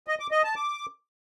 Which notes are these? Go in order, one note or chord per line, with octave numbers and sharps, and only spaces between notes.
D#5
D6
D#5
A5
D6